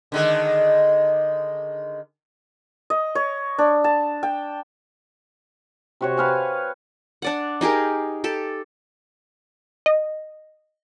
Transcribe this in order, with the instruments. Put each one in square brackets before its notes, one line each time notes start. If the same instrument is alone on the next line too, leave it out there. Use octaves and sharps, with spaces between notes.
[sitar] D3 D#3 G#3
[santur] D#5
C#5
D4
A5
G5
[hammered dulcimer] C3 F#4 C#5
B4 F5 G#5
[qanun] D4 D5 F#5
D#4 G4 G#4 A#4
G4 A4
[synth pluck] D#5